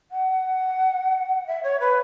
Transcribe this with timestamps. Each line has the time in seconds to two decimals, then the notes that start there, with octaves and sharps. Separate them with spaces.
0.11 F#5
1.47 E5
1.63 C#5
1.80 B4